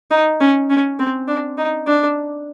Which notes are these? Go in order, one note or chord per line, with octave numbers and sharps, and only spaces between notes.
D#4
C#4
C#4
C4
D4
D#4
D4